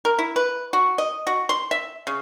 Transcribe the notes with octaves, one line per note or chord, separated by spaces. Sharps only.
A#4
E4
B4
F#4
D#5
F#4
C6
E5
C#3